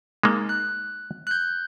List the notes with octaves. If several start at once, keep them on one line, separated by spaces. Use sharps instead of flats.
G#3 A#3 D#4
F#6
F#6 G6